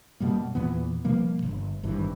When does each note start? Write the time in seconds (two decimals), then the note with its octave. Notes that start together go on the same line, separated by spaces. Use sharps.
0.20 F#2 B2 G3 A#3
0.55 E2 A#2 E3 B3
1.05 B2 F3 G3 A#3
1.42 G1
1.83 G#1 G2 E3